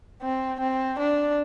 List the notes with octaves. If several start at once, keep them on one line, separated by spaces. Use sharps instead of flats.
C4
C4
D4